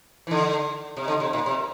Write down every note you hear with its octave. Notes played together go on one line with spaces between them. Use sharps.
E3
D3
C3
D3
C3
A#2
C3